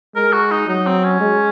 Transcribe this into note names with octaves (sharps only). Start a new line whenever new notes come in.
G#3 A#4
F#4
D#4
F#3 D#4
C4
C#4
G#3